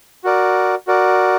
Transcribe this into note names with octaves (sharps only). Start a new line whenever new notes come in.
F#4 A#4 D5
F#4 A#4 D5